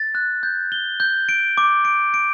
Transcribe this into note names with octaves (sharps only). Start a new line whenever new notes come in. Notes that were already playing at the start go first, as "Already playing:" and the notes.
Already playing: A6
F#6
G6
G7
G6
D7
D6
D7
D7